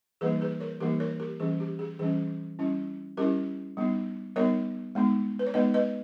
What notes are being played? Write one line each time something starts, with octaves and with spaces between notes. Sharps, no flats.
E3 G3 A#3 D#4 G#4 B4
G#4 B4
A#4 C#5
E3 G3 A#3 D#4 G4 A#4
A#4 C#5
G4 A#4
E3 G3 C#4 G#4
G4
G#4
E3 G3 C#4 G#4
G3 C#4 E4
G3 C#4 E4 G4 A#4
G3 B3 D#4
G3 B3 D#4 A#4 C#5
G#3 B3 D#4
B4
C#5
G#3 B3 D#4 B4 D#5
B4 D#5